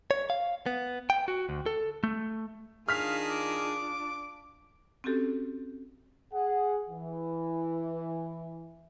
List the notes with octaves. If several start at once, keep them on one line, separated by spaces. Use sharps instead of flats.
C#5
F5
B3
G5
F#4
D2
A4
A3
D#3 D4 F4 G#4 F5 F6 B6
D6
C4 C#4 F#4 G4 A4
G#4 F#5
E3